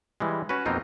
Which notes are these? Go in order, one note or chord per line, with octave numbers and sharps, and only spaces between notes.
E3 G3 G#3
C#4 F#4 B4
F2 B2 A#3 C4 D#4 F4